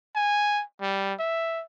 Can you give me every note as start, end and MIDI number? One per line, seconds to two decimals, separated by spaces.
0.15 0.63 80
0.82 1.14 55
1.19 1.63 76